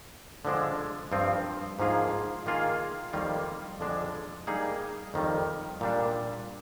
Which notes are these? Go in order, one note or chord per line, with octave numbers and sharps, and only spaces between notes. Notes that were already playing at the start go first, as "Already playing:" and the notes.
D3 F3 G#3 D4
G2 F3 C4 F4
G#2 F3 A#3 F4 G#4
D#3 A#3 F4 G#4
F2 D#3 G3 A#3 F4
F2 D3 F3 G#3 D4
G3 A#3 D#4 G#4
F2 D#3 G3
A#2 G3 D4